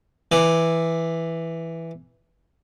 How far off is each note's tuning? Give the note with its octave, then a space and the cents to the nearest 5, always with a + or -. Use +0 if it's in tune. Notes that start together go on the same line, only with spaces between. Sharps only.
E3 +0 D5 +0